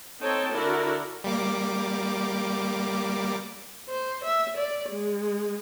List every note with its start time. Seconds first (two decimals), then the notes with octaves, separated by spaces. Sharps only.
0.20 C4 D#4 A4 C#5 G5 A5
0.53 D3 E4 F#4 A#4 D5
1.24 G3 A#3 D6
3.89 C5
4.25 E5
4.57 D5
4.89 G#3